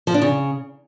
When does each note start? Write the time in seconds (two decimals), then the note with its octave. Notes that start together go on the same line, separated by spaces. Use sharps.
0.07 F3
0.14 D4
0.22 C#3